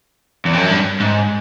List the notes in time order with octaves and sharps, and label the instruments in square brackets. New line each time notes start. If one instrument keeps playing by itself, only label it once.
[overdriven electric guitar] E2
F2
F#2
G2
G#2